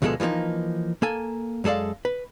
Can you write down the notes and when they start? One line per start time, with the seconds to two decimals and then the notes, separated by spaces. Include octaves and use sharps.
0.02 D2 B2 F3 G#3 F4 A4
0.20 E3 F3 G3 A#3 D#4
1.02 A#3 A4 G#5
1.64 F#2 G#3 A4 D5 F5
2.05 B4